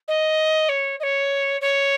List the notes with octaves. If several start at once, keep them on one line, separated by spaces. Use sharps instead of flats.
D#5
C#5
D#5
C#5
C#5